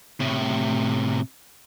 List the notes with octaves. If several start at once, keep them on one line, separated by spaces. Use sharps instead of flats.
A2 C3